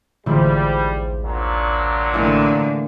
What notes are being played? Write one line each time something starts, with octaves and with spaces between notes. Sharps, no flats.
A1 D2 G#2 F3 G3 E4
A#2 F#3 D4
A2 D3 E3 A#3 D#4